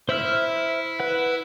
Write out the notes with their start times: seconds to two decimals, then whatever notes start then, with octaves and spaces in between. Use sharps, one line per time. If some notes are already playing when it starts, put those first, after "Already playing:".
0.09 E4 C5 E5 F6
1.00 B4 F#5